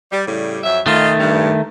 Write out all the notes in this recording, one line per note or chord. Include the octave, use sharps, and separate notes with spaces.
G3
A2 C#3 G3
F2 F#3 E5
D#3 A3 F4 D#5
G2